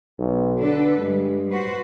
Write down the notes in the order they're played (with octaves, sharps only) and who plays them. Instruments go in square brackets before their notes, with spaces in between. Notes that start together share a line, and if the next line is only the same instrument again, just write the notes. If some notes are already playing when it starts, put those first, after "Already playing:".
[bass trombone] B1
[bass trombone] D3 [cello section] D4 A4 B4
[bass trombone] G2 [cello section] G3 G#3
[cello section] F#4 B4 C5